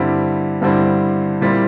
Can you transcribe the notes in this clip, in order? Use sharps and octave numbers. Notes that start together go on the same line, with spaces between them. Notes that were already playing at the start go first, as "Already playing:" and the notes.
Already playing: G2 D3 G3 C4 E4
G2 D3 G3 C4 E4
A#2 G3 C4 E4